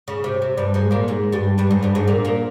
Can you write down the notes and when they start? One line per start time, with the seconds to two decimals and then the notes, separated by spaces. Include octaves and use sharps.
0.08 C#3
0.24 C3
0.42 C3
0.58 G2 G3
0.74 G#2 G#3
0.91 A#2 A#3
1.08 G#2 G#3
1.32 G2 G3
1.58 G2 G3
1.71 G#2 G#3
1.83 G2 G3
1.95 G#2 G#3
2.08 A#2 A#3
2.25 A#2 A#3